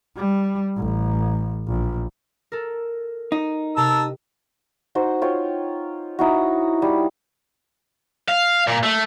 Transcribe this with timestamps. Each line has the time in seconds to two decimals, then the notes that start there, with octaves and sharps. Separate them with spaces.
0.16 G3
0.77 A1
1.67 A#1
2.52 A4 A#4
3.32 D#4
3.77 C3 A#4 A5 E6
4.95 D#4 F#4 C5
5.22 F4 C#5 G5
6.19 D#4 E4 F#4
6.82 G3
8.28 F5
8.67 A#2
8.83 A3